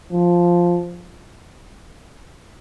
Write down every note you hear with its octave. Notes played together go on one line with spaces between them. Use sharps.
F3